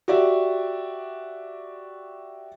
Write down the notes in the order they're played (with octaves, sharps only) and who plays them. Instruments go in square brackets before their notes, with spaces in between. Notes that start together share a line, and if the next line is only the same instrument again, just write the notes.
[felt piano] F#4 G4 D5 E5